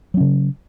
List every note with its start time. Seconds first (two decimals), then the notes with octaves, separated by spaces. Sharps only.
0.14 F#3
0.17 C#4
0.20 C#3